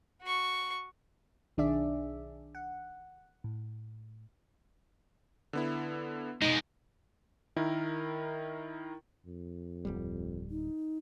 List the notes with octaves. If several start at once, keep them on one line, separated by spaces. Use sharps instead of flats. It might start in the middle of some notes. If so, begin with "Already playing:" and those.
F#4 C#6
B1 D#3 D4 G#4 D5 E5
F#5
A2
D3 B3 E4
B2 G#3 D#4
D#3 E4 A#4
F2
D1 G1 G3
D#4